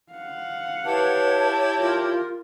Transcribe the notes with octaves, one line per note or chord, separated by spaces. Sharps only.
F5 F#5
E4 G4 B4 C#5 A5
F4 A#4